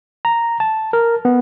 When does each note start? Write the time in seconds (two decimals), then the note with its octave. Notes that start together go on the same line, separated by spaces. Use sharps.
0.25 A#5
0.60 A5
0.93 A#4
1.25 B3